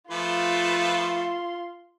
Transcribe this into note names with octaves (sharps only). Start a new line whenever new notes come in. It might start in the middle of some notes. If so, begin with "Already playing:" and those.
F3 A3 F4 B4 C6